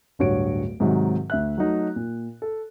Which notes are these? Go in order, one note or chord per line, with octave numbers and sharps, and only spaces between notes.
D1 G2 F#4 C#5 D7
G#2 C3 D#3 F#3
D2 E5 F#6
F#3 A3 D#4
A#2
A4